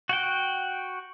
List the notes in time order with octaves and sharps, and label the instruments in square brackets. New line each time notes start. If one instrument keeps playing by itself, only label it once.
[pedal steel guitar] F#4 F#5 G5